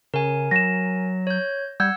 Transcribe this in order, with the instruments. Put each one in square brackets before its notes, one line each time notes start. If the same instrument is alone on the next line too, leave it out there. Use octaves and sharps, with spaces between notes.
[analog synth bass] C#3 [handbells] A#4 G#5
[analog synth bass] F#3 [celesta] A#6 E7
[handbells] C#5 G6
[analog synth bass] G3 [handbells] F#5 E6 [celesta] G6 G#6